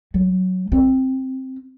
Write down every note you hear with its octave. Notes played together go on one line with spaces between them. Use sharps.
F#3
C4